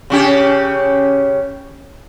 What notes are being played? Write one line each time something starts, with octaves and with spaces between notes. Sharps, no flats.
C#3 C#4 G4